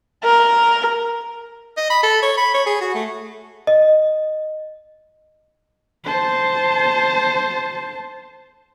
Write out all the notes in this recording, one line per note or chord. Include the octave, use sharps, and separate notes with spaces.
A#4
D#5
B5
A4
C#5
B5
C#5
G#4
F#4
A3
D#5
C5 A5